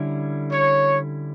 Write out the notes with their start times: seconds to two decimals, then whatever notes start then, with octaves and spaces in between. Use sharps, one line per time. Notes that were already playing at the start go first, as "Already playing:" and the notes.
Already playing: D3 G3 C#4 E4
0.52 C#5